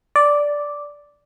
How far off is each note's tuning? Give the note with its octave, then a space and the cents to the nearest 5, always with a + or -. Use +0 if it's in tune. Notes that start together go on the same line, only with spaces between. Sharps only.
D5 -5